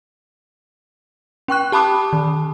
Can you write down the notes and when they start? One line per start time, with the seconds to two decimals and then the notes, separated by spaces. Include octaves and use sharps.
1.48 C#4 G5 C#6 F#6
1.72 G4 A5 B5 D6 D#6
2.13 D#3